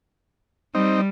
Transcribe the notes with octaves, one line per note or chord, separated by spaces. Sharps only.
G3 C4 D#4